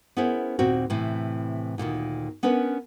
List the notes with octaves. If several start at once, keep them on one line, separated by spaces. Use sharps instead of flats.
B3 C#4 E4 G#4 A#4 C5
D#2 A#2 C4 F#4
A2 C3 E3
D2 A#2 D3 D#3
B3 C#4 D4 A#4 B4